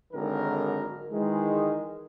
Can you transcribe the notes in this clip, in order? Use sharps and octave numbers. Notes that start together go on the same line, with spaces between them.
G#1 D3 D#3 F#3 A#4
D#3 E3 G#3